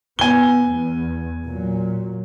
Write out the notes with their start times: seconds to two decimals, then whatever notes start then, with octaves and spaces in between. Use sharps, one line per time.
0.19 B2 B3 G#5 G7
0.67 E2 B3
1.43 A#2 F#3